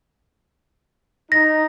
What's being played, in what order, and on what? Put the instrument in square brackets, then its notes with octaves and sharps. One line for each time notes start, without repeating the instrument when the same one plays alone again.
[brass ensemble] D#4 [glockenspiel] A#6